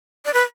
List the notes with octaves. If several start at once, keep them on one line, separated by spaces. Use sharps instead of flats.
D5
B4